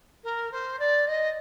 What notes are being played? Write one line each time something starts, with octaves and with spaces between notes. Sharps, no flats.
A#4
C5
D5
D#5